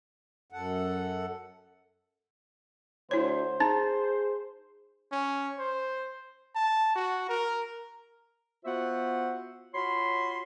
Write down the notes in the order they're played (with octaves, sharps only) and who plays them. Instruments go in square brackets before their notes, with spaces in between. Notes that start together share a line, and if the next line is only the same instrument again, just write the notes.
[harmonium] F#2 A4 F#5
[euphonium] D2 [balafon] E4 C#5 [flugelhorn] C5
[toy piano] D#4 [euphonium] G#4 [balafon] A#5
[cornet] C#4
C5
A5
F#4
A#4
[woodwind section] B3 F4 F#4 C5 E5 F#5
F4 F#4 C#5 B5 C6